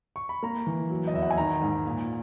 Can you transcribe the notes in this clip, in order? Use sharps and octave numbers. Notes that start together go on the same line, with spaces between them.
C#6
B5
A#3 A#5
E3
F#3
D#5
E2 E5
F#5
G#5
D#3 A#5
G#2
A#2